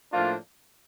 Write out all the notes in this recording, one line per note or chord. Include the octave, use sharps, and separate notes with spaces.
A2 F3 A#3 D4 F4